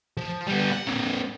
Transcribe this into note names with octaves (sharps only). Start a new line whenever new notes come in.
F3
G3 B3
F#5
A#3 C4